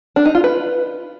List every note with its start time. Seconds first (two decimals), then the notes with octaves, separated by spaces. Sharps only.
0.16 D4
0.25 D#4
0.35 F4
0.44 B4